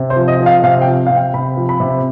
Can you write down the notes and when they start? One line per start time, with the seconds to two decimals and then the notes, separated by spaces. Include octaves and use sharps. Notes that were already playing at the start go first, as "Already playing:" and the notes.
Already playing: C3
0.10 C5
0.16 F3
0.28 D#5
0.41 F3
0.46 F5
0.64 C3 F5
0.81 G5
0.87 F3
1.07 C3 F5
1.16 G5
1.34 C3 B5
1.57 F3
1.69 B5
1.80 C3